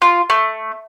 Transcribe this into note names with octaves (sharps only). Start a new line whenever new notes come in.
F4
A3